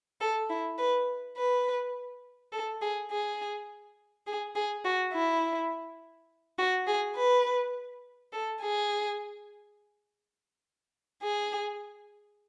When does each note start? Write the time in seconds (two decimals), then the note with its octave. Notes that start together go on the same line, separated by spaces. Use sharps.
0.21 A4
0.50 E4
0.78 B4
1.37 B4
2.52 A4
2.82 G#4
3.11 G#4
4.27 G#4
4.55 G#4
4.85 F#4
5.13 E4
6.58 F#4
6.87 G#4
7.16 B4
8.33 A4
8.62 G#4
11.22 G#4